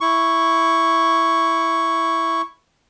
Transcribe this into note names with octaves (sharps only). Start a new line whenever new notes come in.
E4 C#6